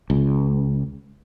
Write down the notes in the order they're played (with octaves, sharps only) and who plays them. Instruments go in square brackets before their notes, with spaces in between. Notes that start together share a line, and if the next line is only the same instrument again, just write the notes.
[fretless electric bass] C#2